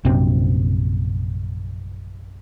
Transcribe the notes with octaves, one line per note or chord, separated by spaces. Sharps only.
A#1 F#2 C3 C4